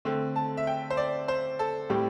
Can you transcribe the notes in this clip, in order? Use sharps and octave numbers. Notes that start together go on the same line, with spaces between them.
D3 A3 C4
A5
E5
G5
C5
D5
C5
A4
A2 G3 C4 G4